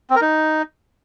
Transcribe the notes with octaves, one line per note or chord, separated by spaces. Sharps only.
C4
A#4
D#4